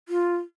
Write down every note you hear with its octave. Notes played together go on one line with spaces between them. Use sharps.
F4